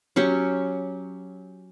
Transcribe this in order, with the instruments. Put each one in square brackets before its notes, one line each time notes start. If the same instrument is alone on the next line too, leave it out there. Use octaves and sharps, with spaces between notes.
[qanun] F#3 C#4 G4 C#5